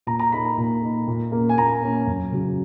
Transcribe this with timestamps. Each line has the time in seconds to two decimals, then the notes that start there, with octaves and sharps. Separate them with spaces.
0.07 A#2 A#5
0.19 A#5
0.32 A#3 D#4 B5
0.45 A#5
0.58 A#2
0.82 A#3 D#4
1.08 A#2
1.32 A#3
1.37 C#4
1.49 G#5
1.57 A#2 A#5
1.82 A#3 C#4
2.07 F#2
2.32 C#3 F#3